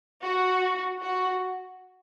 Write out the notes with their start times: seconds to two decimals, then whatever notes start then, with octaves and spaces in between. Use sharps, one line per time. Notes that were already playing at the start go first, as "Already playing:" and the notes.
0.24 F#4
1.01 F#4